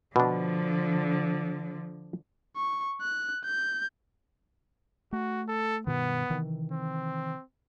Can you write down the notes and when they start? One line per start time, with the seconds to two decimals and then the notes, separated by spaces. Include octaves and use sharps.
0.16 B2 D3 F3 D4
2.56 C#6
3.02 F#6
3.45 G6
5.13 A3 F#4
5.48 A4
5.87 G2 B2 D#3 B3
6.30 C3 D#3 E3
6.72 C4